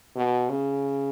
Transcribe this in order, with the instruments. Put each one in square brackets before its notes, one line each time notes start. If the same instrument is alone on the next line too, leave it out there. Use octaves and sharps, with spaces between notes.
[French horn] B2
C#3